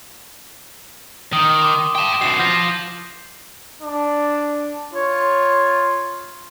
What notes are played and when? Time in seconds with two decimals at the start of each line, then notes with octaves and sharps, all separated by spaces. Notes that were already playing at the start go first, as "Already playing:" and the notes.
1.33 D#3 D#6
1.61 C6 D6
1.95 G5 A5
2.21 F#2 B2 C7 E7
2.39 F3 F4 G6 A#6
3.82 D4
4.94 F4 C#5